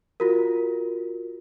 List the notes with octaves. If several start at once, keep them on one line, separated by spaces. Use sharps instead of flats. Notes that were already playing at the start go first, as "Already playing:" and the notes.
F4 F#4 A#4